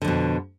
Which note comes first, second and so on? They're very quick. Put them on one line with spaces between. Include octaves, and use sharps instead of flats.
D3 F2 B2